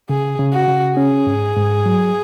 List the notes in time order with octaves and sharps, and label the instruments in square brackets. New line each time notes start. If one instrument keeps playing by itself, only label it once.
[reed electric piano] C#3 [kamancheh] G#4
[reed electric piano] C#3
[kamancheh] F#4
[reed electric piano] C#3
[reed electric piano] C#4 [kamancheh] G#4
[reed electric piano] G#2
G#2
F#3